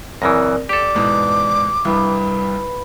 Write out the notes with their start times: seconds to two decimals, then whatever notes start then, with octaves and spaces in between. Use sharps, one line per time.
0.22 F#2 C#3 E3 C4 A#4 D5 A#6
0.69 G4 A4 D5 D6
0.95 E2 G#2 B2
1.85 C2 G2 B4 B5